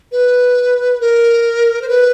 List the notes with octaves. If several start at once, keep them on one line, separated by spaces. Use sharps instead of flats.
B4
A#4
C5
B4